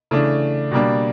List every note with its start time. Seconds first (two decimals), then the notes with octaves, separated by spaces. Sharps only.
0.11 C#3 E3 A3 D4
0.71 B2 G3 A#3 D4